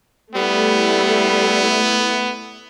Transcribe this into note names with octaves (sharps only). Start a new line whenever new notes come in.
G3 A3 B3 E4